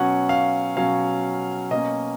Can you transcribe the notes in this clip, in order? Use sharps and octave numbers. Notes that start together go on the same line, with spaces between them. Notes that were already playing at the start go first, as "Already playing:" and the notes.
Already playing: B2 F#3 C#4 F#5
F5
B2 F#3 C#4 F5
B2 A#3 C#4 D#5